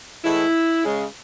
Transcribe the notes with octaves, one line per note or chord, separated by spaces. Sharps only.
A2 E3 G#3 E4
C#3 G#3